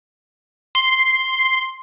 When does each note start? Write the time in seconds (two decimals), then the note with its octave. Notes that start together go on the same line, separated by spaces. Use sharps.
0.75 C6